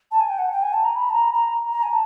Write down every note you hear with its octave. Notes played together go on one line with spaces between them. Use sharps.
A5
G#5
G5
F#5
G5
G#5
A5
A#5
B5
A5
A#5
A#5
A#5
G#5
A5